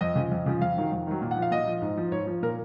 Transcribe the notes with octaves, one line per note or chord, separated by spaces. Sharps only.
F2 D#5
C#3 F3
F2
C#3 F3
F2 F5
D#3 F#3
F2
D#3 F#3
A#2
F#5
F3
F5
A#2 D#5
F3
G#2
F3
G#2 C#5
F3
A#2 A#4